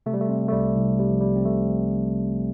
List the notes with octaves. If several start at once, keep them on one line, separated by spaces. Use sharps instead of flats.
C3 A3
G3
A3
C3
A3
C2 G3
C2
C3 G3
F3
C3 G3
C4
C2 A3